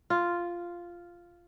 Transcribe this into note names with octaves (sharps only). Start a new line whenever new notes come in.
F4